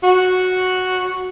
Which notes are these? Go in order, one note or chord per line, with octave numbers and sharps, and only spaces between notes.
F#4